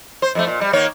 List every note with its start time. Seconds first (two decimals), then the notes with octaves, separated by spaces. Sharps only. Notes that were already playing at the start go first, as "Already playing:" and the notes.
0.22 C5
0.35 F2 D#3 A3
0.47 A#2
0.61 G3
0.73 D#3 A#3 C#5